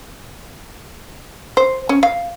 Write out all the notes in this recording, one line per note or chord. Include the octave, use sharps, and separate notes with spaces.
C5
C#4
F5